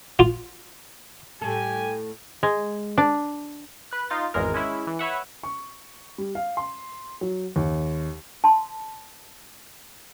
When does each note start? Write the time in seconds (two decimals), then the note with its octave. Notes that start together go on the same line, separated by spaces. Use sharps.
0.19 F4
1.42 A2 G3 G4 A4 G#5
2.43 G#3
2.98 D4
3.91 B4 F#6
4.10 D#4 F4 C6 A6
4.34 G#1 E2 G#3 A#4
4.54 G#3 C#4 E4
4.87 E3
4.99 B4 C#5 E5 F#5
5.43 C#6
6.18 G3
6.35 F5
6.57 C6
7.21 F#3
7.56 D#2
8.44 A5 C6